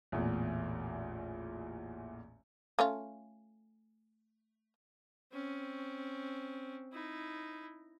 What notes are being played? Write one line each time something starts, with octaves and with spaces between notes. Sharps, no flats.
A1 E2 A#2
A3 C#4 F4
C4 C#4
D#4 E4